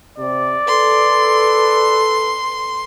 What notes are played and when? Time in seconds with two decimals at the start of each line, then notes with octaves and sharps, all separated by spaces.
0.18 C3 D5
0.68 A4 B4 C6